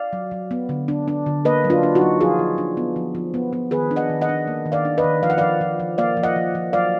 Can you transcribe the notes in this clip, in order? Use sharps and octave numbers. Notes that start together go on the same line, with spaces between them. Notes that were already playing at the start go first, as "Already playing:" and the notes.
Already playing: D5 F5
F#3
F#3
B3
D3
D4
D4
D3
A#3 B4 D#5
F#3
D4 F4
D4
D#4 F#4
F#3
F3 F4 G#4
F3
D4
B3
F3
F3
B3
B3
D#3 G#4 B4
D4
D#5 F#5
D#3
D#5 F#5
D4
A#3
D#3
D5 F5
D4
B4 D#5
D#3
F3 F5
F#5
F3 D5 F5
F3
F3
A#3 D5 F5
F3
D#5 F#5
F3
F3
F#3 D5 F5